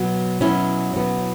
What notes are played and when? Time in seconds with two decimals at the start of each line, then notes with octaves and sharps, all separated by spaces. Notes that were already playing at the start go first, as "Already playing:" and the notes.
Already playing: B2 F#3 B3
0.41 B2 F#3 B3 C#4 E4
0.93 B2 F#3 B3